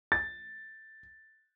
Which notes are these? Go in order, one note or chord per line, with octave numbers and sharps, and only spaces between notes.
A6